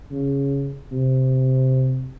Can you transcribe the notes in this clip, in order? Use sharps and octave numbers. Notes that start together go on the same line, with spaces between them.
C#3
C3